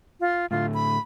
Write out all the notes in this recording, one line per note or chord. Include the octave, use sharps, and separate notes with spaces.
F4
A2 D3 F4
B5